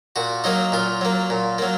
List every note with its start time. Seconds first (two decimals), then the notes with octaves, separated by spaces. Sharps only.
0.16 A#2 F#4
0.44 F#3 A#3 D#4
0.72 A#2 F4
1.01 F#3 A#3
1.30 A#2
1.58 F#3 A#3